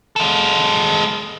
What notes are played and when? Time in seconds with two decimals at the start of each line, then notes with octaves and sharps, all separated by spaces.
0.16 G#3 A4